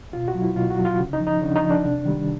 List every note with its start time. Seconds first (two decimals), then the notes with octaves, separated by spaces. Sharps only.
0.13 B2 F4
0.28 F#4
0.35 F#3
0.42 E4
0.56 B2 F4
0.70 F#4
0.78 F#3
0.85 F4
0.99 C#3
1.13 D#4
1.20 F3
1.27 D#4
1.42 C#3 D4
1.56 D#4
1.62 F3
1.71 D4
1.85 C3
2.05 D#3 G3